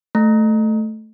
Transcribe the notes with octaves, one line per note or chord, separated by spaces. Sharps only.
A3